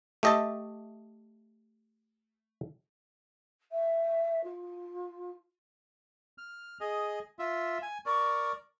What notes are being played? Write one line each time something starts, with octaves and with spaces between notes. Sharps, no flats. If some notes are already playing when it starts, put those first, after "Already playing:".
A3 G4 D#5 E5 A5
E5
F4
F6
G#4 D#5
F4 E5
G#5
A#4 D5 C#6